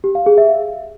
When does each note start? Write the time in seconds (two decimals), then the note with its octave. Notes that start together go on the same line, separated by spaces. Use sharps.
0.04 G4
0.15 F5
0.26 G#4
0.38 E5
0.49 F5